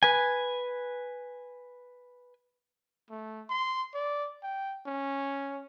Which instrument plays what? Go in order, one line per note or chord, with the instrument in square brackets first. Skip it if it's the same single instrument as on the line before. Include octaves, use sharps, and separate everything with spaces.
[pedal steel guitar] B4 G#5
[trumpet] A3
C6
D5
G5
C#4